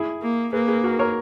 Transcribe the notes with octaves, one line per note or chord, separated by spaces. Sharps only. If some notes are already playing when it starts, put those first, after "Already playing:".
Already playing: E4 G#4
A#3
A#3 G#4 B4
G#4 B4
F#4 A#4
A#4 C#5